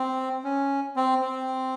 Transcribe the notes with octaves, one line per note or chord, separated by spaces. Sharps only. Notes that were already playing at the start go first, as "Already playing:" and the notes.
Already playing: C4
C#4
C4
C4